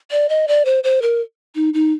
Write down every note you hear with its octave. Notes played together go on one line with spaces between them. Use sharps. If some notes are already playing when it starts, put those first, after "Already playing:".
D5
D#5
D5
C5
C5
A#4
D#4
D#4